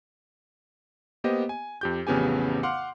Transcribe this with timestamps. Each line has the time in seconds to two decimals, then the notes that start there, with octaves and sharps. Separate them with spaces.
1.24 A#3 B3 G4 C5 D#5
1.49 G#5
1.81 F2 G4 G6
2.07 A1 F2 C#3 B3 G4 G#5
2.63 F5 F#5 C6 D6 F6